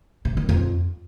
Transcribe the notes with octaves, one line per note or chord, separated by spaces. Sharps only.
C3
D#3
F2